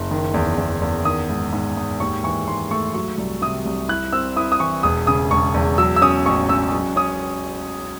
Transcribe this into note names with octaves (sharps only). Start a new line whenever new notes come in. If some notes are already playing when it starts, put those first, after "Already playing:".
Already playing: F#1
D#3
E2
E2
E2
D#3 D#6
G#2
G#2
G#2
D#2 C#6
E3 C#6
D#2 C6
A3 C#6
F#3 C#6
C2
C3 D#6
C2
E4 F#6
C4 E6
E4 D#6
D#6
E3 C#6
E1 D#6
C#3 D#6
E1 C#6
E2
F#3 E6
E6
C#4 D#6
A1 C#6
C#4 E6
F#3
C#4 D#6